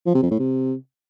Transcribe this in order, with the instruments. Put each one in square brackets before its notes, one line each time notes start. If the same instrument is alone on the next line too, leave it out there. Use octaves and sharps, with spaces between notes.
[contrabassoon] F3
C3
F2
A2
C3